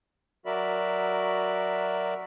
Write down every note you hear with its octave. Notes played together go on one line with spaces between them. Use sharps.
F#3 F#4 A#4 D5 E5 B5